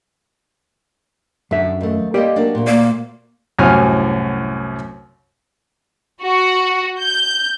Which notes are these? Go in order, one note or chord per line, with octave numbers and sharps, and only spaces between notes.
F#2 D3 E5
D#2 A3
A#3 G4 C5 D5 D#5
F#3 A#3 D4
D2 A#2
A#3 D5
C2 F#2 A2 F#4 G#5 F6
F#4
G6